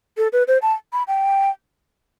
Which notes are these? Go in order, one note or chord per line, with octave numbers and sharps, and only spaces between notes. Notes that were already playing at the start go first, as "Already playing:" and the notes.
A4
B4
C5
A5
B5
G5